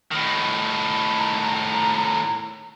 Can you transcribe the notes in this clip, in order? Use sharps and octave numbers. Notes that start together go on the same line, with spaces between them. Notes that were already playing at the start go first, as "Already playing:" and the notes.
A2 D#3
A#5